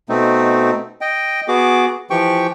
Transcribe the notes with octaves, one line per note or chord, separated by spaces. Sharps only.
B2 A3 C4 D#4
D#5 G5
B3 F#4 G#4 D6
E3 F3 G4 G5 C#6